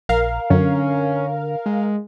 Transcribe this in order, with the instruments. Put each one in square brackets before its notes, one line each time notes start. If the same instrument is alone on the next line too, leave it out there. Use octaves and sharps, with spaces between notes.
[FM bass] A#1 [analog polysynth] A#4 F5
[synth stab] F#2 [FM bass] D3 [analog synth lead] C#4
[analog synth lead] G#3